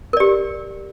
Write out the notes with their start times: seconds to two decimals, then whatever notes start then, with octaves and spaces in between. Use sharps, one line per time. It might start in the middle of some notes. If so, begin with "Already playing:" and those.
0.13 A#4
0.17 D5
0.20 G4